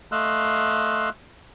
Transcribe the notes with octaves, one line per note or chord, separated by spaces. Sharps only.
A3 D#5 F5 C6 E6 F#6